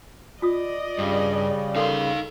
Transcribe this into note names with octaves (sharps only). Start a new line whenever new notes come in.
F4 D5 D#5 D#6
G2 C#3 G3
D#4 A4 A#4 F5 C6